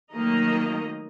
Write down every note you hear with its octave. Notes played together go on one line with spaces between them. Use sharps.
D#3 F#3 A3 A#3 D#5 A#5